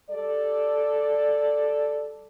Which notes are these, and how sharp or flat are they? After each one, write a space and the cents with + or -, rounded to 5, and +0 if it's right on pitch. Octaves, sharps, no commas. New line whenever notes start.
G3 +0 A4 +0 D5 +0